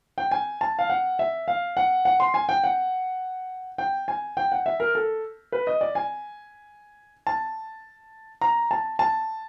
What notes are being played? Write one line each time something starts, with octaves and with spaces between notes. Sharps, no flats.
G5
G#5
A5
F5
F#5
E5
F5
F#5
F#5
C6
G#5
G5
F#5
G5
G#5
G5
F#5
E5
A#4
A4
B4
D#5
D5
G#5
A5
A#5
A5
A5